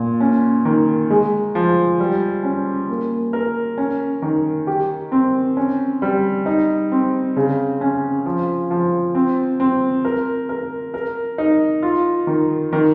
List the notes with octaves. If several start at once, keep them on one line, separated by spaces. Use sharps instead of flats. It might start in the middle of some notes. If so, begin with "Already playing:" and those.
Already playing: A#2
C#4
D#3
G#3
F3
G3
C#4
A#3
A#4
C#4
D#3
G4
C4
C#4
G3
D#4
C4
C#3
C#4
F3
F3
C4
C4
A#4
A#4
A#4
D#4
F4
D#3
D#3